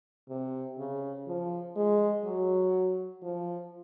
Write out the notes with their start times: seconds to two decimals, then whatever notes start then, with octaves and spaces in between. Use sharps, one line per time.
0.29 C3
0.78 C#3
1.27 F3
1.76 G#3
2.25 F#3
3.23 F3